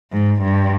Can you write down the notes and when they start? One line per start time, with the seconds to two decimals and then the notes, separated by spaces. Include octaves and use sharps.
0.12 G#2
0.42 G2